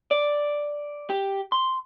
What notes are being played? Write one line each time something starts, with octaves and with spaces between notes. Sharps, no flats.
D5
G4
C6